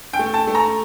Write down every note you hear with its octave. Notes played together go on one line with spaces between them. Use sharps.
G5
A3
A5
A3
A#5